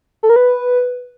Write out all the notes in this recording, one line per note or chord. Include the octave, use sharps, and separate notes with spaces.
A4
A#4
B4